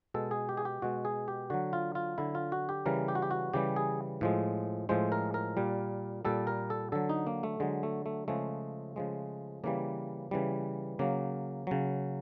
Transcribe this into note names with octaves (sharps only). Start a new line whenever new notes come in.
B2 G#3 A4
G#4
G4
G#4
G4
B2 G#3 F#4
G#4
G4
D3 F#3 F#4
F4
F4
D3 F#3 E4
F4
F#4
G4
C#3 E3 G3 A#4
G4
F#4
G4
F#4
C#3 E3 G3 G4
G#4
A2 F3 G#3
A2 F3 G#3 C5
A#4
A#4
A#2 G3
A#2 G3 A4
A#4
A4
D3 F#3 A4
D#4
A#3
A3
D3 F#3 G#3
A3
A3
C#3 F3 G#3 A3
C#3 F3 G#3
C#3 E3 G3 A#3
C#3 E3 G3
C#3 F#3 A#3
C#3 F#3